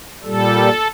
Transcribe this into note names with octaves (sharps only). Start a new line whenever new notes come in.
A#2 G3 A4